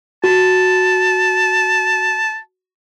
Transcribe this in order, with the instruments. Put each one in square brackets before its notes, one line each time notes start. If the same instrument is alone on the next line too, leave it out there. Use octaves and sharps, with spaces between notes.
[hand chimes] F#4 [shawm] A5